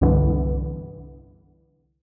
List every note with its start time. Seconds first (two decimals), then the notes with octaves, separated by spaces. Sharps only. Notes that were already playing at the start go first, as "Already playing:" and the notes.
0.01 C2 G2 D3 E3 B3